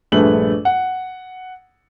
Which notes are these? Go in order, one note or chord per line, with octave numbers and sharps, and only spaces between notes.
A#1 G2 A3 G#4 B4 F#7
F#5